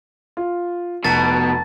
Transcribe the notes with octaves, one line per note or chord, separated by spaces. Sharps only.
F4
F1 B2 A5 A6